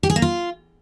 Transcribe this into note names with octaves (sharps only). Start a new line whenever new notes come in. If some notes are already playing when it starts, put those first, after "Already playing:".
G4
G#4
A#3
F4